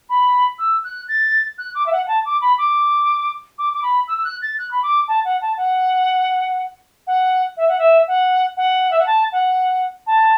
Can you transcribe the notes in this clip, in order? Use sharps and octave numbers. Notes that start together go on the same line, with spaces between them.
B5
E6
F#6
A6
F#6
D6
E5
F#5
F#5
A5
D6
B5
D6
D6
D6
B5
E6
E6
F#6
A6
F#6
B5
D6
A5
F#5
A5
F#5
F#5
E5
F#5
E5
F#5
F#5
E5
F#5
A5
F#5
A5